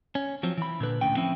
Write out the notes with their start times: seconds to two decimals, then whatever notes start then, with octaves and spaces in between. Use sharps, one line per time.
0.15 C#4
0.43 F3 F#3 C4
0.57 E3 B5
0.80 A#2 D3 B4
1.01 D2 A2 C#4 G5
1.16 F3 C4 C#4 E4